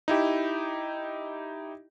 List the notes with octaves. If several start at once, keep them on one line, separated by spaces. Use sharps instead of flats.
D#4 E4 G4